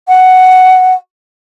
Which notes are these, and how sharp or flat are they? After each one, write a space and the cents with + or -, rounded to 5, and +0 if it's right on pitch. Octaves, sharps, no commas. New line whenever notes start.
F#5 +5